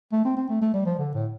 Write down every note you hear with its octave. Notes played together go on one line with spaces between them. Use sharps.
A3
C4
C4
A3
A3
G3
F3
D3
A2